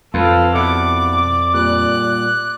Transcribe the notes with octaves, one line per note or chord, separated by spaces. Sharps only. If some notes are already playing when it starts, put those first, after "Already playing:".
F2 F4 A4 B4 F5
B2 E4 D5 F#5 D6
A#2 G3 F#6